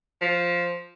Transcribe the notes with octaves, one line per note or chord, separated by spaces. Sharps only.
F3